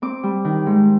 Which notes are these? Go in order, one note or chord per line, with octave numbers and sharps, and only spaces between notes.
C4 D6
G3
D#3
G#2